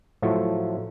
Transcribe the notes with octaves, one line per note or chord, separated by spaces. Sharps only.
A2 F3 F#3 A3